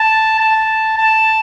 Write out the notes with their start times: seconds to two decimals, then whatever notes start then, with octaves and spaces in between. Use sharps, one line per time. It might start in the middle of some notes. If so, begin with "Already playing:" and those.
Already playing: A5
0.39 A5
0.98 A5